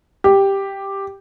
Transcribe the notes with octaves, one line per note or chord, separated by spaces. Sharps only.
G4